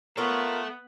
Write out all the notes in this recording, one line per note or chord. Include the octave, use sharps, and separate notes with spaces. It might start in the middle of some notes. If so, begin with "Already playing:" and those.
B3 F4 A4 A#4 C#5 E5